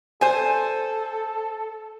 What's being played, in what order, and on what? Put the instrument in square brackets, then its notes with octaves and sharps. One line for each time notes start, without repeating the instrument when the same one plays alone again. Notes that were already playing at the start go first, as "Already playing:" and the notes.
[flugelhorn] A4 [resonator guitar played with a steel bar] C5 G#5